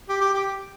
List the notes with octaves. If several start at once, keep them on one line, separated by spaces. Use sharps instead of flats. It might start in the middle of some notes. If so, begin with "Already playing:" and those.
G4
G4
G4